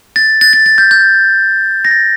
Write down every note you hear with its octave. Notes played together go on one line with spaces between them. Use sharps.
A6
A6
A6
A6
G6
G6
A#6
A6